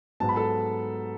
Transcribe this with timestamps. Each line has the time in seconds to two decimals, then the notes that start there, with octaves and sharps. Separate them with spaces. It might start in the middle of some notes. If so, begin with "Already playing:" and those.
0.20 G#2 F#3 B3 A5
0.29 B5
0.36 A4 A5